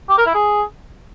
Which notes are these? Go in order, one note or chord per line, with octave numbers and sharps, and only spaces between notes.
G4
A#4
E4
G#4